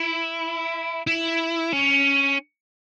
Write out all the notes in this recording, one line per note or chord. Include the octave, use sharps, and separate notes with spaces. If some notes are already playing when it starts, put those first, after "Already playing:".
Already playing: E4
E4
C#4